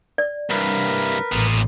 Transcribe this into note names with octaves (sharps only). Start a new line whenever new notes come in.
D5
C2 G2 A#4 B4
A1 A#2 B3